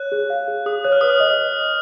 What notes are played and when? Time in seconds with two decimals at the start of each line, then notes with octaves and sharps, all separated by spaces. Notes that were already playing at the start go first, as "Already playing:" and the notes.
Already playing: C#5 F#6
0.12 G#4
0.30 F5
0.48 G#4
0.66 G#4 D#6
0.85 C#5 F#6
0.92 F6
1.01 B4 D#6
1.09 F6
1.20 D#5